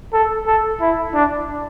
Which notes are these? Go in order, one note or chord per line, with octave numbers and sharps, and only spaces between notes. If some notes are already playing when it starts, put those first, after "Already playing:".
A4
A4
E4
D4